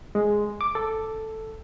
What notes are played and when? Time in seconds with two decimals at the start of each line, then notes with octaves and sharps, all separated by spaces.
0.15 G#3
0.61 D6
0.75 A4